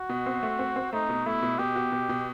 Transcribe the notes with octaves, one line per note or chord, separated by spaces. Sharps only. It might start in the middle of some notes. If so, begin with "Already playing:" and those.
Already playing: F#4
B2
C4
A3
C4
C4
A3 D#4
B2
A3 E4
B2
B2 G4
F#4
B2
B2